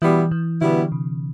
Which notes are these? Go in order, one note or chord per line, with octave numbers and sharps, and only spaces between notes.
B2 E3 G3 B3 E4
E3
B2 D3 G3 B3 E4
C3